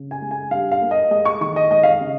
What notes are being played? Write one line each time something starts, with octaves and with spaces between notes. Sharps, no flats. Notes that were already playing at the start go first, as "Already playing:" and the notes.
Already playing: C#3
G#5
G#3
G#5
G2 F5
F5
A#3
D#5
G#3 D#5
C#6
D#3 C#6
D#5
G#3 D#5
F5
D#5
C#3